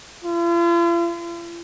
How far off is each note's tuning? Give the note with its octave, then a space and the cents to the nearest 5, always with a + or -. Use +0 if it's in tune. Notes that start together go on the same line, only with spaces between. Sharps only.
F4 -45